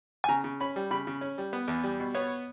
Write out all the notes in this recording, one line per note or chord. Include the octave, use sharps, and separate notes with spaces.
G#5
C#3 A#5
C#3
C#4 B5
G3
C#3 B5
C#3
C#4
G3
B3
E2
G3
B2
B3 C#5